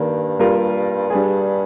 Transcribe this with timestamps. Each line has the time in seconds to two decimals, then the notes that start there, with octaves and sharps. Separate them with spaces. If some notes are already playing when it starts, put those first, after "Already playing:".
Already playing: G2 D#3 A#3 D4
0.39 G3 A#3 F4 A#4
1.10 G3 D4 G#4